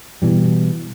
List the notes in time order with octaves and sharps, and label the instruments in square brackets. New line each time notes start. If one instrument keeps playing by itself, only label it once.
[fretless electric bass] B2 E3 G3